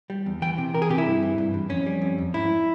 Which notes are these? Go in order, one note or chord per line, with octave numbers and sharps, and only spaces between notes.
G3
E2
E3 G5
C3
C3 A#4
G#4
C3 G4
E4
G2
E3
G2
G2
F2 C#4
G3
F2
F2
G#2 E4